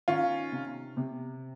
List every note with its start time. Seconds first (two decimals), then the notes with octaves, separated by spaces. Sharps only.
0.08 D#3 C#4 F4
0.52 C3
0.97 C3